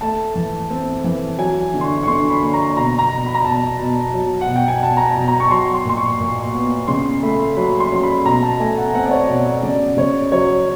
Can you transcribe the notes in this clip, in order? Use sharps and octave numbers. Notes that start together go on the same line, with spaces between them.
A3 A5
E3
C4
E3
F#3 G#5
D3
C6
C#6
C#6
D3 C6
B5
A#3
A#5
B2 A#5
A#5
B2
B5
A#5
B2 A5
B2
F#3
F#5
B2
G5
G#5
B2 A5
A#5
A5
B2
A#5
C#6
F#3 C6
C6
A#2 C6
C#6
A#2
B3
C#3 C6
A3 B5
F#3 B5
C6
F#3 C6
B5
B2 A#5
A5
A3 G#5
F#5
C4 F#5
D5
C#5
B2 D5
D#5
C#3 D5
C#3 C#5
F#3 C#5